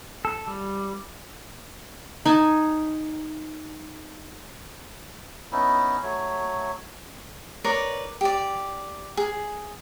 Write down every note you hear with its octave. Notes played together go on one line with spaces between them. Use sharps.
A4
G3
D#4 G#5 A5
B3 C#4 D#4 E4
F#3 A3 C#5
A#4 B4 C#5 D5
G4 D5
G#4